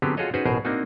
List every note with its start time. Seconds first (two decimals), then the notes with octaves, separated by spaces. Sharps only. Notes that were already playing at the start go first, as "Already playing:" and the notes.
0.02 D3 F#3 B3 C4 G4 G#4
0.17 F4 F#4 G#4 A4 C#5 D#5
0.34 C#4 D#4 F#4 G#4 B4 C5
0.45 A1 B2 G#4 A#4 C5
0.65 A#3 C4 D4 D#4 F#4